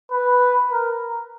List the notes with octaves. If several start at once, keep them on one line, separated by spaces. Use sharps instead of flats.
B4
A#4